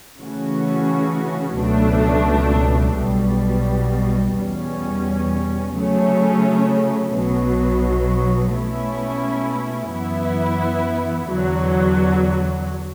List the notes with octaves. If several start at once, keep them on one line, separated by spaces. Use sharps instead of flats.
C#3 E3 A3 C#4 F#4
C#2 B2 F#3 A3 D4
B1 B2 G3
E2 B2 G3 C#4
C#3 F#3 A3 C#4
B1 B2 F#3
B2 A3 C#4 E4
F#2 E3 B3 E4
E2 D3 F#3